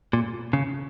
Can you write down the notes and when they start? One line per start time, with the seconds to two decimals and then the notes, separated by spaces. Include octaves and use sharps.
0.13 A#2
0.53 C#3